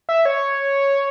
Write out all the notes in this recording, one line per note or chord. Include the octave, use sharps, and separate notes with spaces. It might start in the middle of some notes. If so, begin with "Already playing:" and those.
E5
C#5